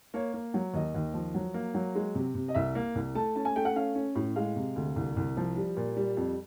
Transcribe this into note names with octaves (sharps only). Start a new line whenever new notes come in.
A#3 C#5
A#3
F#3
D#2 D#5
D#2
F3
F#3
A#3
F#3
G#3
C3
C3
D#5
C2 E5
A#3
C2
A3 A5
C#4 A5
G#5
A3 G5
F#5
C#4 F5
C#4
A2
G#3 F5
C3
D2
C2
C2
F3
G3
A#2
G3
F2